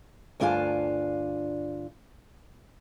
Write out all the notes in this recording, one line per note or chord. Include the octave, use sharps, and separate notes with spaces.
D2 G2 D4 F4 F5 G#5